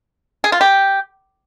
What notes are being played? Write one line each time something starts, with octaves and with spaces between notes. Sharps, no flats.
G#4
F4
G4